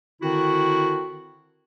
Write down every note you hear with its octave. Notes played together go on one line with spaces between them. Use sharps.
D3 D#3 C4 E4 F#4